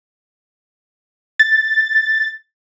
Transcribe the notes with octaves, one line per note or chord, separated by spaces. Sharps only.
A6